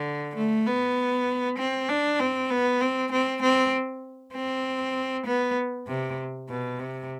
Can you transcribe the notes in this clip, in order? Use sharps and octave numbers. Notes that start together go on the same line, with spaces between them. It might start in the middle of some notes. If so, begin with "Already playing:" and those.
Already playing: D3
A3
B3
C4
D4
C4
B3
C4
C4
C4
C4
B3
C3
B2
C3